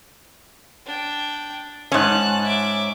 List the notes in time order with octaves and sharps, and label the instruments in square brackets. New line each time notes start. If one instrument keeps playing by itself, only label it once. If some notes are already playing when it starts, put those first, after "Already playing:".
[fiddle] D4 G5
[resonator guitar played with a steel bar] G#2 C#4 [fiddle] A5 F#6
[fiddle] E5 D6